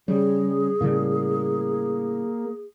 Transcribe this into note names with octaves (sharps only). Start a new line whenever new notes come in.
C#3 G3 G#4
A2 C#3 G3 A#3